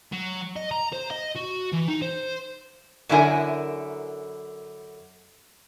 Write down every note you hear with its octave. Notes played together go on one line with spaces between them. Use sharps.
F#3
D#5
A#5
C5
D#5
F#4
E3
D#4
C5
F#2 D3 E4 G4 A#4 G#5